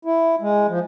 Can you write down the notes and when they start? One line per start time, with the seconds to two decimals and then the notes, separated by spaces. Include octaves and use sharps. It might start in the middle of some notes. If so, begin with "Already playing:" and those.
0.05 E4
0.41 G#3
0.68 F3